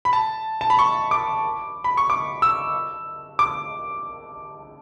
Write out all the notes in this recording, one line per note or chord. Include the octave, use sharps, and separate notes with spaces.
B5
A5
A5
B5
C#6
D6
B5
C#6
D6
E6
D6